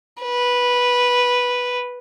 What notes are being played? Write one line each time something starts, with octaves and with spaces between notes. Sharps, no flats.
B4